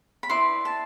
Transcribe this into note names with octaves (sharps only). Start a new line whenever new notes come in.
B5
E4 B4 D5 C6
A5